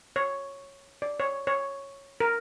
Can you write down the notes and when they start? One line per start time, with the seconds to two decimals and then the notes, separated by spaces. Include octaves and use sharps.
0.16 C#5
1.02 D5
1.20 C#5
1.47 C#5
2.20 A#4